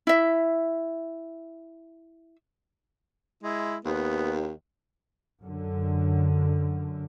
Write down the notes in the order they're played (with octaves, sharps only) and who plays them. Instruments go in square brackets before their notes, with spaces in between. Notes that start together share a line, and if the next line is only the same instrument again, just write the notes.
[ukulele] E4 E5
[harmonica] G#3 E4
[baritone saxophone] D#2 [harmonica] B3
[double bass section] F#2 D3